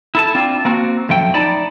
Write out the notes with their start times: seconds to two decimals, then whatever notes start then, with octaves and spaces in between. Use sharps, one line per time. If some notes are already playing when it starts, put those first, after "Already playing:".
0.15 E4 A4 A5
0.35 C4 D4 F4
0.65 A#3 C4 F#4
1.09 F#2 F3 A3 G5
1.34 D#4 D5 A5 B5